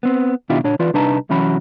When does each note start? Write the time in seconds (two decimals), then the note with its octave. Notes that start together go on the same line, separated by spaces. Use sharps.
0.03 B3 C4
0.50 B2 D#3 D4 E4 F4 G4
0.64 A#2 D4 C#5
0.79 E3 F4 B4 D5
0.94 C2 D4 D#4 B4 A5 A#5
1.29 C2 E3 F#3 C#4 F#4 B5